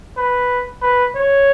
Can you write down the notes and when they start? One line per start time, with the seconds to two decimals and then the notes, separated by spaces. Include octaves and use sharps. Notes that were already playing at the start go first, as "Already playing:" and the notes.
0.17 B4
0.82 B4
1.16 C#5